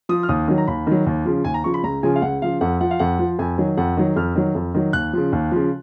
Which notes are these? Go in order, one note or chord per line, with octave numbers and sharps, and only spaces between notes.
F3 D#6
F6
D#2 D#6
D#3 F#3
A#5
D#2 B5
D#3 F#3
D#2
C#3 F3
D#2 G#5
A#5
C#3 F3 C#6
B5
C#2 A#5
C#3 F3 G#5
F5
C#2 F#5
C#3 F3 F5
F2 F#5
F3 F#5
F5
F2 F#5
F3
F2 G#5
D#3 F#3
F2 F#5
D#3 F#3
F2 F6
D#3 F#3
F2
D#3 F#3
D#2 F#6
C#3 F3
D#2
C#3 F3